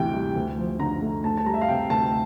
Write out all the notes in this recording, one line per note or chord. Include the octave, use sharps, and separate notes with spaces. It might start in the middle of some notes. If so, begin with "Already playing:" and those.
Already playing: D2 C3 E3 G5
G3
D2
F3
D3 A#5
A3
D2 A5
A5
G3 A#5
E5
F5
C3 G5
D2 A5